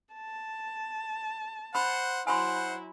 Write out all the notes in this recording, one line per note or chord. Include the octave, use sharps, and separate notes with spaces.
A5
C5 F#5 B5
F#3 E4 C5 F#5 G#5 B5 C6